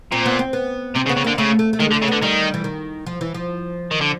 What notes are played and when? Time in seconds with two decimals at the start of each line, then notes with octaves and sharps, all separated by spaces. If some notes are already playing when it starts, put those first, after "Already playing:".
0.12 A#2 C4
0.26 B3
0.39 C4
0.53 B3
0.96 C3 C4
1.07 C#3
1.09 B3
1.17 C#3
1.24 D3 A#3
1.38 C#3 A3
1.59 A3
1.73 A3
1.80 D#3 G#3
1.91 D3
1.94 A3
2.02 C#3
2.08 D3 B3
2.22 D#3 G3
2.54 E3
2.64 D#3
3.06 F3
3.21 E3
3.34 F3
3.91 D#3
4.01 D3